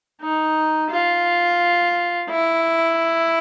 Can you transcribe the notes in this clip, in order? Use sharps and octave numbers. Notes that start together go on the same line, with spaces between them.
D#4
F4
E4